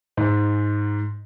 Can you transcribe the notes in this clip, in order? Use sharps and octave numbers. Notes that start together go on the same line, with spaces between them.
G#2